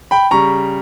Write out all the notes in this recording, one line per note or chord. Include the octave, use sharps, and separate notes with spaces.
G5 B5
C#3 G3 A#5 C#6